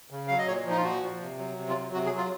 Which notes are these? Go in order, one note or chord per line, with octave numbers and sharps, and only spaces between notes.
C#3
F#3 F5
D#5
A#2 C#5
F3 D#4
F4
A#2 F#4
F3
C3
F#3
C3
F4
F#3
C3 F#4
G#4
F#3
F4